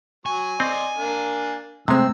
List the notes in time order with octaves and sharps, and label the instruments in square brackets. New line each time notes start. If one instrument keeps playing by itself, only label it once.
[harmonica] F#3 C#6 [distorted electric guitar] G#5
[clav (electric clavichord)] C4 [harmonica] D5 D#5 C6
[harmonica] A#3 D4
[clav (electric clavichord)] C3 G#3 [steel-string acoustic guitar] A3 C4 [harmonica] E6